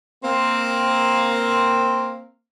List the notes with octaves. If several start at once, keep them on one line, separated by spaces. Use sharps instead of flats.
A#3 C4